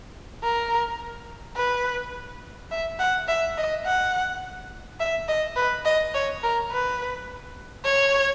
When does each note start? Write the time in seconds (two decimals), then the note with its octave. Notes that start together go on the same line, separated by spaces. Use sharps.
0.43 A#4
1.56 B4
2.71 E5
2.99 F#5
3.28 E5
3.58 D#5
3.86 F#5
5.00 E5
5.28 D#5
5.56 B4
5.85 D#5
6.14 C#5
6.43 A#4
6.71 B4
7.85 C#5